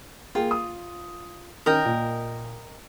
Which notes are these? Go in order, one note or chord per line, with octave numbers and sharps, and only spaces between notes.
A#3 F4 G#4 G5
D#6
D#3 C#4 A#4 D#5 G5
A#2